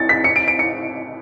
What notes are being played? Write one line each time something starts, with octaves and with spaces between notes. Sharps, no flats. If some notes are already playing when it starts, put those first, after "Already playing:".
Already playing: A6 C#7
B6
C#7
D7
D7
C#7